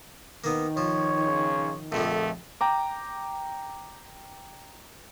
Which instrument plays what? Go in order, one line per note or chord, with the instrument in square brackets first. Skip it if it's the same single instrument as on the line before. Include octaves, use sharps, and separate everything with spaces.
[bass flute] D#3 [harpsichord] A#3 B3
[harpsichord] F3 [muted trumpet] C#5
[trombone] C#3
[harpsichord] A#1 F2 D3 [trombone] A3
[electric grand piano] G5 A#5 D6